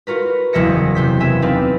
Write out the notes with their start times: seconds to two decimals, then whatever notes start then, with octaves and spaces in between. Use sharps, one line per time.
0.07 F4 F#4 A#4 B4
0.53 F#1 E2 F3 E5 A#6 C#7
0.95 C3 C5 B6
1.20 B3 E5 G#5
1.42 C4 D#4 B4 D5 F5